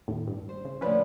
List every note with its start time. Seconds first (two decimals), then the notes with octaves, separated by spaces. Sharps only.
0.08 D#2 A2
0.27 G2
0.49 C5
0.65 C#3
0.81 A2 D3 F3 C#4 B4